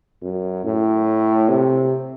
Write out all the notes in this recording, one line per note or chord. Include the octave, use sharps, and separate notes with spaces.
F#2
A2
C3